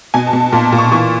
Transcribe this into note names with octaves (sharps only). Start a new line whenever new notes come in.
B2 G#5
A5
B2
A5
A#2 A5
A5
A#2
C#6
E3 C#6